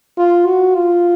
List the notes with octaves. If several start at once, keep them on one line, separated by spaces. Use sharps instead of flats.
F4
F#4
F4